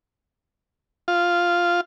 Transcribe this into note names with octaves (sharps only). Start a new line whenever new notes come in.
F4